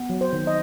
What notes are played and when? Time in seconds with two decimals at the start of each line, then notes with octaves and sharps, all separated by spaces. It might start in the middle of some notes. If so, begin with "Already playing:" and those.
Already playing: B3
0.10 F#3
0.21 C5
0.33 D#3
0.47 D#5